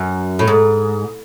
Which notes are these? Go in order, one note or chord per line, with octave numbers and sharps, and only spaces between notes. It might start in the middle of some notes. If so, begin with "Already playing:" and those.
Already playing: F#2
A2
G#2